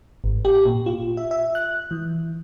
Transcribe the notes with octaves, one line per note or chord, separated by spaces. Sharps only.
G#1
G4
A#2
F4
E5
E5
F#6
E3